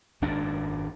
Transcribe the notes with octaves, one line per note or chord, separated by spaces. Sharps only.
G#1 F#2 A#2 D4